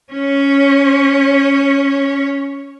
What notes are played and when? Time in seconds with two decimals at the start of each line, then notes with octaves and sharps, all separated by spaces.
0.12 C#4 C#5